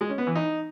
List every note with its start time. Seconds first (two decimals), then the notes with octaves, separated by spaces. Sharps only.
0.01 G#3
0.09 C#4
0.18 B3
0.27 E3
0.35 D#4